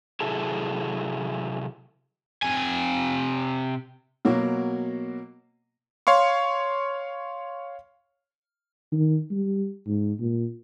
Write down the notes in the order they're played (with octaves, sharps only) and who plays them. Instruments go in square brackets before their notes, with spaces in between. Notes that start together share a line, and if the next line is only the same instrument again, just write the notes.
[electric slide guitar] C3 F#3 E4 G#4 A4 A5
[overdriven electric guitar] C3 G#5
[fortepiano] B2 F#3 A#3
[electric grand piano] C#5 F5 C6 C#6
[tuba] D#3
G3
G#2
A#2